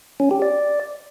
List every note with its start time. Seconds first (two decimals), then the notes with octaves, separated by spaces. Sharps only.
0.20 C#4
0.31 G4
0.42 D5